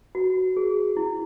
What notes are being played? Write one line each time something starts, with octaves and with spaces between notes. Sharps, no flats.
F#4
G#4
E4